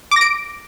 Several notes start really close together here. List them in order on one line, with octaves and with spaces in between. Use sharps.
D6 A#6 D7